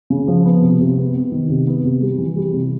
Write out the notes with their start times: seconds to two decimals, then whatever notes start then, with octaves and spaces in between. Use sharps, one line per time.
0.10 C#3
0.28 F3
0.45 B3
0.62 C3
0.80 C3
0.97 B3
1.15 B3
1.32 D#3
1.49 C3
1.67 B3
1.84 C3
2.01 G3
2.18 E3
2.36 G3
2.54 C3